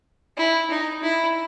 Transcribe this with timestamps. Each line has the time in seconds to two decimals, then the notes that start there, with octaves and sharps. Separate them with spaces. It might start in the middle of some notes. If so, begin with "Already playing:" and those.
0.37 E4
0.70 D#4
1.02 E4